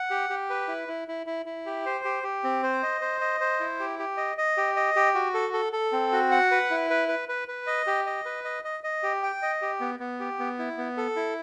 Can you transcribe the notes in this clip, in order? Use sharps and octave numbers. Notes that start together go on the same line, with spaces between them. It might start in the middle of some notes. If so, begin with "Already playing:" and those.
Already playing: F#5
G4
G4
B4
E4
E4
E4
E4
E4
G4
C5
G4
G4
C4
C5
D#5
C5
D#5
C5
E4
G4
G4
D#5
D#5
G4
D#5
G4
F#4
A4
A4
A4
C4
F#4
F#5
B4
E4
B4
B4
B4
B4
D#5
G4
D#5
B4
D#5
D#5
D#5
G4
G5
D#5
G4
B3
B3
G4
B3
E4
B3
A4
E4